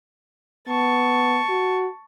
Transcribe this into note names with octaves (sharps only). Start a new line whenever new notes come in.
B3 A5 C#6
F#4